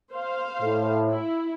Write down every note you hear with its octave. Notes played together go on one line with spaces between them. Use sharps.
C5 F5
A2
E4